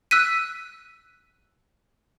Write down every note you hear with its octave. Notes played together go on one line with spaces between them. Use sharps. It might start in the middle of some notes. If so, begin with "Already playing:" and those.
E6 F#6 B6 D#7